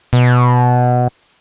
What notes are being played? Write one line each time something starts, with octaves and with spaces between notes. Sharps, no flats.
B2